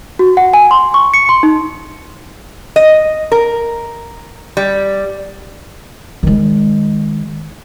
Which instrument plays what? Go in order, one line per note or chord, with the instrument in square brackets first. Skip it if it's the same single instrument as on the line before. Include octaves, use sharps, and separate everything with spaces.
[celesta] F#4
F#5
G#5
C6
C#6
C#7
C6
D#4
[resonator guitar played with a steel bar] D#5
A#4
G3
[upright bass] D#3 G#3